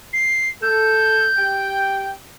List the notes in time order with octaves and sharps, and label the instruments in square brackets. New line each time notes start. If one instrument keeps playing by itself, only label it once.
[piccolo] C7
[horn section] A4 [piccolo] G6
[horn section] G4 G5